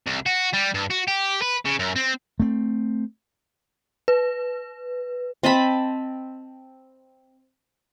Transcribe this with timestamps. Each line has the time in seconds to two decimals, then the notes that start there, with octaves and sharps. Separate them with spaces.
0.07 C2
0.26 F#4
0.53 G3
0.74 G2
0.90 F#4
1.08 G4
1.42 B4
1.65 C#3
1.79 F#2
1.96 C4
2.40 A3 C4
4.08 B4
5.43 C4 D#5 A5 B5